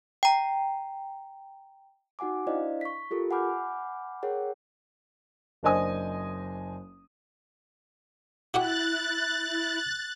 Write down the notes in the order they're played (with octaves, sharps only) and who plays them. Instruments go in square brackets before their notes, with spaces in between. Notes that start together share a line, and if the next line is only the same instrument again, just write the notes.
[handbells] G5 A#5
[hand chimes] D#4 F#4 F#5 G#5 D6
D4 E4 C5 D5 D#5 F5
C#6 B6
F4 G4 A4 A#4
F#5 G#5 B5 D6 F6 G6
G#4 A#4 C#5 F#5 G5
[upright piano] F#1 D4 C5 D#5 G#5 D#6
[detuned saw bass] E4 [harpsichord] F#4 G4 F#5 [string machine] F#6 A6